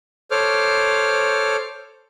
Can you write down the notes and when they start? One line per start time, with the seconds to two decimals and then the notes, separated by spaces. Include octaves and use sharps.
0.31 A4 C5 C#5 D6 F6